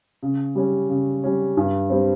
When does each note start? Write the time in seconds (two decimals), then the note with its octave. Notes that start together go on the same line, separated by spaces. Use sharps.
0.23 C#3
0.55 G3 C#4
0.89 C#3
1.24 G3 C#4
1.57 G2
1.90 G3 C4